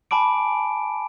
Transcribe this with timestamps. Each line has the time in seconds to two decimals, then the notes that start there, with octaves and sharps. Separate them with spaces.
0.11 G#5 A5 B5 D6 D7